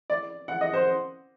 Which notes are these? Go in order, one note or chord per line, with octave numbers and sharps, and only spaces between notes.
D5
F#5
D#5
C5